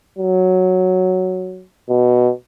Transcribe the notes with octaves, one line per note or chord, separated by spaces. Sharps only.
F#3
B2